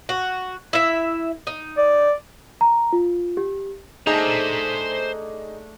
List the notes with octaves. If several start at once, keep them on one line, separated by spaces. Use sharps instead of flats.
F#4
E4 E5
D#4
D5
A#5
F4
G4
A3 D4 D#4 G#4 C5 D#5 A#5